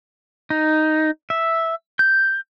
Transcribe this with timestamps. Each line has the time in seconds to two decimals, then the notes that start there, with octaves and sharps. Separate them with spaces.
0.50 D#4
1.30 E5
1.99 G6